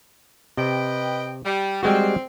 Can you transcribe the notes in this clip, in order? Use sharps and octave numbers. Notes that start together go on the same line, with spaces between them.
C3 B4 D#5 G5
G3
G3 G#3 C4 F#4